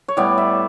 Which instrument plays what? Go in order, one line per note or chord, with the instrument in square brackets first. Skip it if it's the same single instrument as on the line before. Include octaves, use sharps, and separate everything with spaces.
[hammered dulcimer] C#5
A2 G3 B3 D5
E5